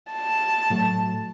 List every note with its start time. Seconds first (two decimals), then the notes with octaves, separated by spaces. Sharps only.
0.12 A5
0.70 A2 F#3 A3